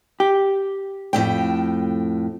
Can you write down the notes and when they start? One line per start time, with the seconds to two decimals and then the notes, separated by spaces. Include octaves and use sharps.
0.20 G4
1.13 F2 A2 G5